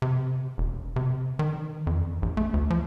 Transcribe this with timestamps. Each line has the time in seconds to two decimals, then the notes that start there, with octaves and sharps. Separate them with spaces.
0.02 C3
0.58 E1
0.96 C3
1.39 D#3
1.87 F2
2.22 A#1
2.37 A3
2.54 D2
2.70 F3